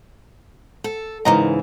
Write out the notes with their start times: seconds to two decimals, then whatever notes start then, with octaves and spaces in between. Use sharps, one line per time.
0.84 A4
1.25 G#2 C#3 E3 A#4 D#5 A#5